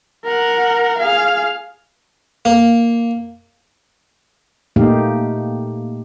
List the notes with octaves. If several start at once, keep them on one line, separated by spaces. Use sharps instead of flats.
A#4 F#5
G#4 F5
A#3
A#2 A3 A#3 D#4 G4 F5